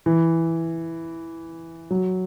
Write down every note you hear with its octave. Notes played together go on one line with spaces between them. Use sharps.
E3
F#3